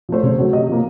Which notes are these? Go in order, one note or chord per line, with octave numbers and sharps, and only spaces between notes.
F3 A3 C5
C#3 C#5
F#3 A3
C3 D#5
F3 A#3